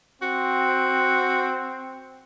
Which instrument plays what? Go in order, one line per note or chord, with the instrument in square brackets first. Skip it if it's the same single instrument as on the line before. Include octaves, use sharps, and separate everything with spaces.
[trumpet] C4 [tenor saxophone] F#4